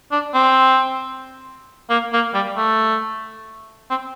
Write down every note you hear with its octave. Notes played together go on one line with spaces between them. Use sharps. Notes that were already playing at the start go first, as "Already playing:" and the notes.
D4
C4
A#3
A#3
G3
A3
C4